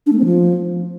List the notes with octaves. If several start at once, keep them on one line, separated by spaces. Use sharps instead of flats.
D4
A3
C4
F3